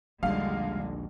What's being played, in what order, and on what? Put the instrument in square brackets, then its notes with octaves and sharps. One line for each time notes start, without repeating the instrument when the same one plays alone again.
[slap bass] A#1 D#2 [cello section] D3 G#3 [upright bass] G3 [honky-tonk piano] F5